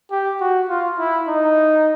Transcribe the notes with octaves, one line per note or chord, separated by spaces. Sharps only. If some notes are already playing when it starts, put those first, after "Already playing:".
G4
F#4
F4
E4
D#4